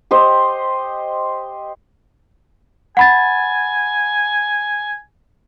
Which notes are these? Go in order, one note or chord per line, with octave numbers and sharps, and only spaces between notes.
G4 C5 D#5
F#5 G#5 B5 A6